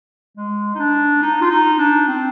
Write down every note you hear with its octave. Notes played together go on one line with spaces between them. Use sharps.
G#3
D#4
D4
D#4
F4
D#4
D4
C4